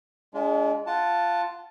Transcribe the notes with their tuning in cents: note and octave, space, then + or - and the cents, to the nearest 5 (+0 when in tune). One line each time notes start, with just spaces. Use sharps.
G#3 +0 D4 -40 F4 -25
F4 -10 F#5 +0 A5 +0